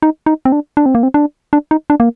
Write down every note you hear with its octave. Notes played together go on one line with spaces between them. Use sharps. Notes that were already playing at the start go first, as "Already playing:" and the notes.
D#4
D#4
C4
D4
D4
C4
A#3
C4
D4
D4
D#4
D4
A#3